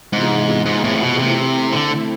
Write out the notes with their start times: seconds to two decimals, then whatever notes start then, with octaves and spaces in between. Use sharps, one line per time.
0.12 G#2 C3 E3 B3 F4 G#4
0.66 G#2
0.84 A2
0.94 C3
1.01 B2
1.18 C3 A3 C4 E4
1.72 D3